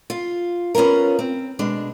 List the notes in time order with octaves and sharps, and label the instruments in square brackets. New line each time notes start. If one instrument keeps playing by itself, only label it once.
[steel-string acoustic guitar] F4
B3 C#4 D4 F4 A#4
C4
B2 G#3 D4